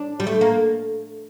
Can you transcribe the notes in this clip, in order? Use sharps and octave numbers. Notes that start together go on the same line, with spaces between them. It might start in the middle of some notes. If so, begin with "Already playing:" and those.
Already playing: D4
G3
A3
A#3